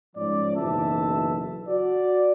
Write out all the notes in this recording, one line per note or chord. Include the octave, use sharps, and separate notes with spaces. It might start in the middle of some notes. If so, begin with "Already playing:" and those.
G#2 F3 C#4 D5
F#1 B1 E3 E5 A5
F#4 D5